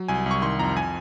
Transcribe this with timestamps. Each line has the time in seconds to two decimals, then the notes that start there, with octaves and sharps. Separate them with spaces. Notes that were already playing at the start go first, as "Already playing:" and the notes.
Already playing: F#3
0.08 C2 G#5
0.26 C2 C#6
0.42 D#3 C6
0.59 F2 A#5
0.77 G#5